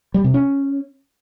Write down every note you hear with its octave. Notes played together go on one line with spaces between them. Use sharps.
G3
C3
C#4